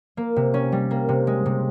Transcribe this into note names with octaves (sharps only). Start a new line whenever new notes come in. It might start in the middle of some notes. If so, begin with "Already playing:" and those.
A#3
C3
C#4
G3
A#3
C3
G#3
C3